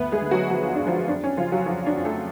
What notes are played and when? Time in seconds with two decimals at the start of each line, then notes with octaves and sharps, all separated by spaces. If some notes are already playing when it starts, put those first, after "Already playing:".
Already playing: D2 B3 B4
0.12 G#3 G#4
0.21 D3
0.31 F#3 F#4
0.50 F3 F#4
0.62 F4
0.75 D2 D4
0.87 F3 F4
1.08 F2 D4
1.24 C#4
1.37 C#3 F3 F4
1.52 F#3 F#4
1.66 F3 F4
1.86 D4
1.96 F2
2.05 A3 A4